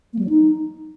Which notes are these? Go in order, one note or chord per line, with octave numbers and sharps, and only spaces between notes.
A#3
G3
F#3
D#4